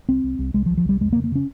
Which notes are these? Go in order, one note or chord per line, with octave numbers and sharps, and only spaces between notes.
C2 C4
C2
C2
C2 G#3
F3
C2
F3
C2 G3
F2 G#3
A#3
C#3
A#3
C#3 C#4